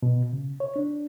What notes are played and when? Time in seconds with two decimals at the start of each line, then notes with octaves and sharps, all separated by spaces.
0.03 B2
0.33 C#3
0.60 C#5
0.76 D4